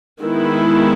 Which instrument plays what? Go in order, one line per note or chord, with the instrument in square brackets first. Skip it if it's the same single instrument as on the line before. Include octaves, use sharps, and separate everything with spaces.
[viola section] D#3 G#3 B3 E4